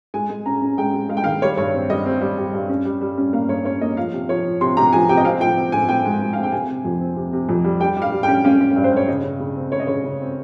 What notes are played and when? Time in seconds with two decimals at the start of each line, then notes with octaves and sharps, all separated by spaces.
0.14 G#3 G#5
0.30 G#3
0.46 C#4 A#5
0.62 C#4
0.78 G#3 G5
0.94 G#3
1.09 G#3 F5
1.17 G5
1.24 D#3 F5
1.42 G3 C#5
1.57 G2 C#5
1.74 C4
1.89 G3 D#5
2.06 C4
2.21 G3
2.38 G3
2.53 G2
2.69 C#4
2.85 G3
3.01 G3
3.18 C#4
3.33 A#3 F5
3.49 G2 C#5
3.65 C#4 C#5
3.81 A#3 D#5
3.97 F3 F5
4.13 C3
4.29 F3 C#5
4.45 F3
4.61 C3 C6
4.77 C3 A#5
4.93 F3 G#5
5.09 C3 G5
5.17 D#5
5.25 C4 F5
5.40 F3 G5
5.57 C4
5.72 C4 G#5
5.89 C4 G5
6.05 G#2
6.21 G#2
6.33 C4 F5
6.43 G5
6.52 C3 G#5
6.69 C3
6.85 F2
7.00 C4
7.17 C3
7.33 C3
7.49 F2
7.64 G3
7.80 G3 G5
7.97 G3
8.02 F5
8.12 G3
8.23 G5
8.28 C#4
8.44 C#4 F5
8.61 C#4
8.76 G2
8.84 C5
8.92 G2 C#5
9.08 C#3 D#5
9.24 C#3
9.40 C#3
9.56 C4
9.72 C#3 C#5
9.80 D#5
9.87 C#3 C#5
10.04 C#3
10.21 C4